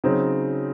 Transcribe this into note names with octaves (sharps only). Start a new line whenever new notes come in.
C#3 F#3 C4 D#4